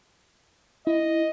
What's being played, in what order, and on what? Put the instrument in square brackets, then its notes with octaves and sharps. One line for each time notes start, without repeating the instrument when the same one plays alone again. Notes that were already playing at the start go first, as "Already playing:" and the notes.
[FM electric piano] E4 [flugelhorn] D#5